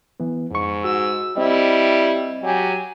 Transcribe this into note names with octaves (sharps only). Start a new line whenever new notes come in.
E3 B3
F2 G#2 C#6
F#4 E6
G3 C4 E4 D#5
F#3 G4 G#5